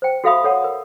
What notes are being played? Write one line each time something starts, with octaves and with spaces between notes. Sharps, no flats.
C5 G5
F#4 A4 E5 F5 B5 D#6
A4 C#5 F#5 A5
A#4